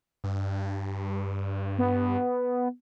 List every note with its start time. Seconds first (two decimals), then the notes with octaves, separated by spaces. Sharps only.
0.24 G2
1.78 B3